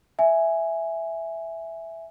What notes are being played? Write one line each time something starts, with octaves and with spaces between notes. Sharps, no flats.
E5 G#5